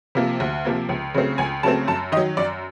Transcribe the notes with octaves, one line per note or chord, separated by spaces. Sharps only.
C3 F3 A#3
D2
C3 F3 A#3
C#2
C#3 F#3 A3 C4
C#2 G#5
C#3 F#3 A3 C4 A5
F#2 A5
D#3 D#5
F#3
F#2 D5